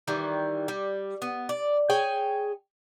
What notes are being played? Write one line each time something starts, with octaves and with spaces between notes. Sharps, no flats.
D#3 E3 G3
G3
B3
D5
G#4 C#5 G5 G#5